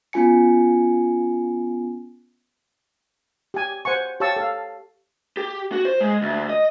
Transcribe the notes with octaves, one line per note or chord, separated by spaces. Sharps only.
B3 C#4 F4 G#5 C#7
G4 G#5
C5 F#5 G#5 C#6
G4 C#5 F5 A5 C#6 E6
A4 F5
G4
F#4
C5
G#3
D2
D#5